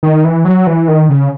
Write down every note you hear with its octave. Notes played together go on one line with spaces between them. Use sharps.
D#3
E3
F#3
E3
D#3
C#3